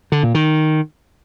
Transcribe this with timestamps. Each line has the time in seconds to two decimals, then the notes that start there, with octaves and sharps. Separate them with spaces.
0.12 D3
0.23 A#2
0.35 D#3